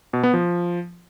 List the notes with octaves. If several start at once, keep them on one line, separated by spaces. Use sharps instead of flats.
B2
B3
F3